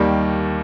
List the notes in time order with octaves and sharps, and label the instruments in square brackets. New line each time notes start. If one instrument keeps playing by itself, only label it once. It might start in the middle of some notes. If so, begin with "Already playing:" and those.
Already playing: [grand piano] D#2 D#3 G3 A#3